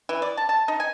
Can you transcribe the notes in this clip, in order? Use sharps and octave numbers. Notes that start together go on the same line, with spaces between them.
E3
D5
A5
A5
D#4
G#5